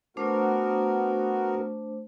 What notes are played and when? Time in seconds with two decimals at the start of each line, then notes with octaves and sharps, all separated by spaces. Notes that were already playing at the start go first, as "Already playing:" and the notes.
0.17 A3 B3 D4 F#4 A#4 C5